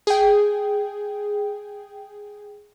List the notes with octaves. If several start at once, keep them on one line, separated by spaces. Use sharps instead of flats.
G#4 G5